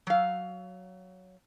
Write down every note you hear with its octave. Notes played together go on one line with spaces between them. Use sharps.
F#3 F5